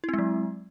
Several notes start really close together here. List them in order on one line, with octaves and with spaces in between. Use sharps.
E4 C4 G#3 F#3